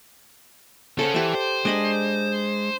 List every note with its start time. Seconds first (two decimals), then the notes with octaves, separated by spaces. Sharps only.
0.99 C#4 G#4 A4 C5 F#5
1.14 E3 G4 D5 E5
1.35 C5
1.65 G#3 D4 D#5 B5